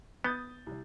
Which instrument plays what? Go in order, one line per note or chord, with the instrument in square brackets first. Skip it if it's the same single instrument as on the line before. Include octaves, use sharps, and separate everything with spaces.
[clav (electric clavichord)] B3 [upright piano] D#6 G6 A6
[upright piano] C2